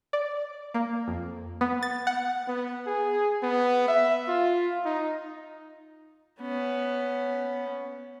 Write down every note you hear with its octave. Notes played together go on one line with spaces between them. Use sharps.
D5
A#3
F2
B3
A6
F#5
B3
G#4
B3
E5
F4
D#4
B3 C#4